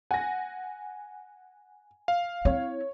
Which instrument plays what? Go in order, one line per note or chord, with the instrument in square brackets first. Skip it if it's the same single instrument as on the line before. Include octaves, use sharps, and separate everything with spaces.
[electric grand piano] F#5 [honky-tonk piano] G#5 A#6
[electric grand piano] F5
[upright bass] C4 E4 [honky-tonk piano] C#5